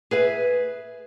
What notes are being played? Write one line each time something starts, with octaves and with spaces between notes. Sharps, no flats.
G#4 B4 E5